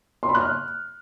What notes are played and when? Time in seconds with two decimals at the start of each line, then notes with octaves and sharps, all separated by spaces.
0.23 C6
0.29 B5
0.35 F#6
0.41 F6